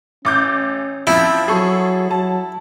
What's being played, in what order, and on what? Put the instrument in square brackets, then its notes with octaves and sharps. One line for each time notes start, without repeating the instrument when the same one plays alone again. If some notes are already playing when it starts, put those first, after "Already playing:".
[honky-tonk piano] A1 D6 G6 [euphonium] C#4
[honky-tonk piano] F3 C4 [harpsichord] E4
[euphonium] F#3 [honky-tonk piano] G#4 A4 C#6
[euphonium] F#3 [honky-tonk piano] A5